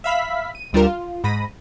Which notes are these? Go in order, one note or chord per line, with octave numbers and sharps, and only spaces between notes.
E5 F5 B5 B6
D#7
D2 G3 D4 F4 A#4 E7
F4
G#2 B5 A#6 D#7